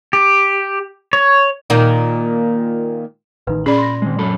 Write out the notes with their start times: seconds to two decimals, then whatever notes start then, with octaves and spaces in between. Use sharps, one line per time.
0.13 G4
1.13 C#5
1.70 A#2 D#3 A#3
3.47 A1 D#3 D#4 B4
3.66 A#2 C#4 G#4 D5 B5
3.78 C6 A#6
4.02 D#3 G#3
4.19 F#2 A4 B5